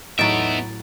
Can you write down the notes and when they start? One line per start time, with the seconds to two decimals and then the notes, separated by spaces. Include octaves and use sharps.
0.19 A2 F#3 B3 D#4 E5 A6 D7